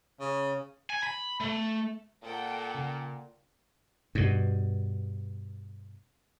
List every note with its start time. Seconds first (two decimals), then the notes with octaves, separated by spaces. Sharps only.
0.20 C#3
0.90 G#5
1.03 B5
1.41 A3
2.23 A#2 A4 F#5 G5
2.75 C#3
4.15 G2 B2